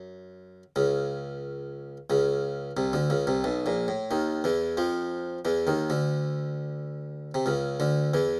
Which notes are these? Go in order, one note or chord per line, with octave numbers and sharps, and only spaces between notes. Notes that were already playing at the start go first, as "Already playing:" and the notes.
Already playing: F#2
C#2 C#3
C#2 C#3
C2 C3
D2 D3
C#2 C#3
C2 C3
B1 B2
A#1 A#2
A2
D#2 D#3
E2 E3
F2 F3
E2 E3
D#2 D#3
D2 D3
C3
C#2 C#3
D2 D3
E2 E3